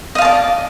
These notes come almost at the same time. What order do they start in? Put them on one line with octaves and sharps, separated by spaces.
D#5 F5 A5 D5